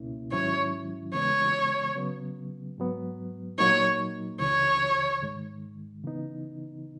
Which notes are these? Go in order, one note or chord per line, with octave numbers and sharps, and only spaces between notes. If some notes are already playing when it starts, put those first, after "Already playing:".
Already playing: C#2 B2 A#3 C#4 E4
G#2 D#3 F#3 C#4 E4 C#5
E2 C#3 E3 G#3 B3 C#5
C#3 F#3 B3
G#2 F#3 B3
A#2 F#3 A#3 D#4 C#5
C#2 C#3 E3 C#5
G#2 D#3 G#3
C#3 E3 B3 D#4